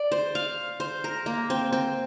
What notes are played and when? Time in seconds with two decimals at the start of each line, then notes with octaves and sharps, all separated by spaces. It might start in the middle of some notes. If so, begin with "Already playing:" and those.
Already playing: D5
0.12 C5
0.35 F5
0.80 C5
1.04 A#4
1.26 A#3
1.50 C4
1.73 C4